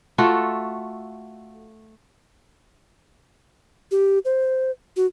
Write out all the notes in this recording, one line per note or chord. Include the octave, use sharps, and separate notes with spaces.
A3 F4 F#4 A4
G4
C5
F#4